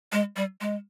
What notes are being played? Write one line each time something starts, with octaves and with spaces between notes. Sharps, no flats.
G#3
G3
G#3